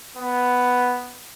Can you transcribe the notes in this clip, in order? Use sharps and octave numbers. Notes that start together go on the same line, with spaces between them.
B3